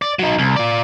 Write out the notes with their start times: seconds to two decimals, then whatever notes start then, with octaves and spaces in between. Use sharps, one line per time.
0.02 D5
0.19 F#3 D#4
0.39 C2
0.56 F4 D5